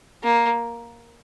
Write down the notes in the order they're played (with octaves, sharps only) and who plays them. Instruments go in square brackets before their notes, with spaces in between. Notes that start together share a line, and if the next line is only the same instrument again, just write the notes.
[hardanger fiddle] A#3